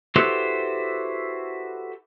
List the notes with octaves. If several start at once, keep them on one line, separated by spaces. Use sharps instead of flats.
E4 F#4 G4 A4 B4 C5